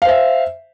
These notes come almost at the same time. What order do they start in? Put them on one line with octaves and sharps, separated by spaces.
F5 C5 E5